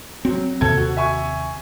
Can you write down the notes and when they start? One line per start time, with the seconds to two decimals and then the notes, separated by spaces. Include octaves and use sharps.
0.25 F#3 C4
0.61 D#2 C3 A4 G#6
0.77 F#4
0.97 E5 G#5 C#6